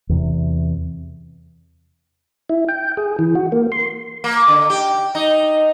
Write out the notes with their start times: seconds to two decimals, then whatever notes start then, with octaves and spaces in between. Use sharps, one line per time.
0.09 E2 C3
2.49 E4
2.68 G5
2.97 G#4
3.19 E3
3.35 F#4
3.52 A#3
3.72 C6
4.24 A#3
4.48 D3
4.70 G4
5.15 D#4